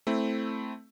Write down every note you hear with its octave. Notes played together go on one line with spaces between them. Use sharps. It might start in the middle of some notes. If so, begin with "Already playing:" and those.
A3 C4 E4